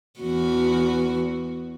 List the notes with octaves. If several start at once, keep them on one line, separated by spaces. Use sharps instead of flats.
E2 F#4